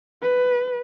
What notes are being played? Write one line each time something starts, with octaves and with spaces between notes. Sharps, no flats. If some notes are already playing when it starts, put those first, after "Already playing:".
B4